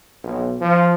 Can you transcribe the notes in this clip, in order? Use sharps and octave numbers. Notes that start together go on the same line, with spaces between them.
B1
F3